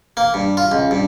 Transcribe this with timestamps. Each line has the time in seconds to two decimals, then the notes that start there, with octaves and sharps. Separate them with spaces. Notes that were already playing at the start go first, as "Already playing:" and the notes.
0.17 A#3
0.34 G2
0.57 F4
0.72 C#2
0.91 G2